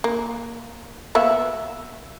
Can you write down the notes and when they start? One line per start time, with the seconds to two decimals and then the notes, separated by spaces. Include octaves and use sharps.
0.04 A#3
1.15 A#3 B3 F#4 E5